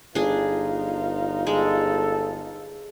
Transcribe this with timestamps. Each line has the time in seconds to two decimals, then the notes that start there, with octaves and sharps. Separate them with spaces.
0.15 G1 D4 D#4 F4 G#4
1.47 G#3 A4